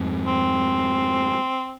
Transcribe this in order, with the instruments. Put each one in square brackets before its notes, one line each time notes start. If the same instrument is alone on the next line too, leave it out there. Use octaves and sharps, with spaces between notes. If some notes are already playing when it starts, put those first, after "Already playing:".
Already playing: [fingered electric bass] F2 G#2
[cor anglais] C4